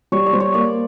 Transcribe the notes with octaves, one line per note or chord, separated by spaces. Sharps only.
G3 C#5
D5
G3 C5
C#5
A#3 D5